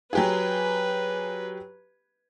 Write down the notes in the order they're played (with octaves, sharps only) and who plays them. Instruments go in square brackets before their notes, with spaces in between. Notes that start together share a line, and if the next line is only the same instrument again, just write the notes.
[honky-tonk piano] F#3 G4 G#4 [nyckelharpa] B4